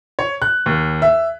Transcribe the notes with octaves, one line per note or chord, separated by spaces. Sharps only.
C#5
F#6
D#2
E5